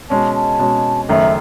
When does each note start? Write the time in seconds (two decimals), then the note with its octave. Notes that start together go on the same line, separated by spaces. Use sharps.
0.10 B2 G#3 C#4 A5
0.35 A5
0.59 B2 G#3 C#4
1.09 F#1 F#2 D#3 F#3 A3 E5